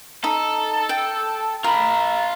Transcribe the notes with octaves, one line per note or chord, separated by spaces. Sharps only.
D#4 A4
G5
F4 A#4 B5